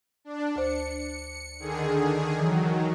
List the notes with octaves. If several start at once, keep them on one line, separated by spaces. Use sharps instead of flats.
D4
D2 C5 C#7
D3 D#3 G#4
D#3 E3 F#3